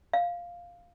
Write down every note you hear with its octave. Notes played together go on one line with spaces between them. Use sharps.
F5